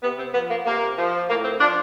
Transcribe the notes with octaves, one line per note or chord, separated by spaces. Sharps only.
C3 B3
C4
F3 B3
A#3
C3 A#3
F3
A2 A#3
C4
F3 D4